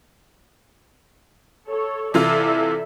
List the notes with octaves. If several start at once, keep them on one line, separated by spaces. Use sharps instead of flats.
A4 C#5
C3 E3 F4 A4 D5 E5